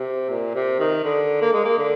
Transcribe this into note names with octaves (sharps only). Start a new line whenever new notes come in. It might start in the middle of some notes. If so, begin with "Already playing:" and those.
Already playing: C3
A#2
C3
D#3
D3
A#3
G#3
A#3
D3